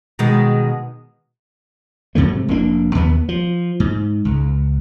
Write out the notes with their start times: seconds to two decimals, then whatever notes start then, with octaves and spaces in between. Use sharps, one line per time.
0.19 B2 D#3 G#3
2.15 G#2 C3 F#3 A3
2.48 F1 A#3 C#4 D4
2.95 D#2 B3
3.29 F3
3.80 G#2
4.25 C#2